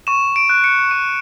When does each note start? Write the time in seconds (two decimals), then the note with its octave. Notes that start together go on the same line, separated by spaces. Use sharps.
0.07 C#6 E7
0.36 D7
0.49 F#6
0.64 C#7
0.91 C#6 D#7